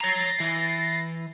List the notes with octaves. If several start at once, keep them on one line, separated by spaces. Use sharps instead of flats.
C#5 A#5 A6 A#6 C7
E3